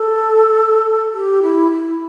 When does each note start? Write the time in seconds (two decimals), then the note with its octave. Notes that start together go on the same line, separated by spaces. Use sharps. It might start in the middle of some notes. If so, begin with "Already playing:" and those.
Already playing: A4
1.13 G4
1.43 E4
1.72 E4